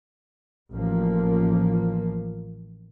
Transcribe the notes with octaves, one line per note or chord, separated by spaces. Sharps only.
A1 F3 A#3